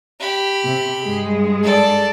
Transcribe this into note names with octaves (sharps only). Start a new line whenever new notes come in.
G4 B5
C3
G2 G#3 G#4
A4 D5